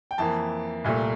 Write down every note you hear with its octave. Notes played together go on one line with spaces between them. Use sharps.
G5
F2 E3 A#3 A5
C2 A#2 A3